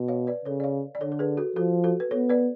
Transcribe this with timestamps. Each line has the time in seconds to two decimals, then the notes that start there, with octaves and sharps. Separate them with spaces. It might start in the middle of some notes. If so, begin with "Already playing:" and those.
Already playing: B2
0.08 C#5 F5
0.27 B4 D5
0.45 C#3 A4 C#5
0.60 D5
0.64 C#5 F5
0.95 D5
1.01 D3 A4 C#5
1.12 A4
1.19 G#4 B4
1.37 F#4 A4
1.56 F3 F#4 A4
1.84 F#4 A4
2.00 B4
2.11 B3 A4 C#5
2.29 B4 D5